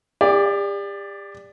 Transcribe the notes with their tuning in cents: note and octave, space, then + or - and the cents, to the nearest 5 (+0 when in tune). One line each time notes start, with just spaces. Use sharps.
G4 +40 D5 +0